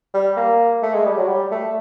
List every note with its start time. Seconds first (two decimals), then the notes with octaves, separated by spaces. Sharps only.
0.14 G3
0.37 A#3
0.82 A3
0.94 G#3
1.05 G3
1.18 F#3
1.28 G3
1.51 A3